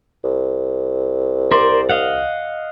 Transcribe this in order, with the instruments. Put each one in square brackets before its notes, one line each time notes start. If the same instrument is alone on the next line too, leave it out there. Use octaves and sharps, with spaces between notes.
[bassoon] C2
[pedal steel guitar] A#4 C5 D5
D#5 F5 F#5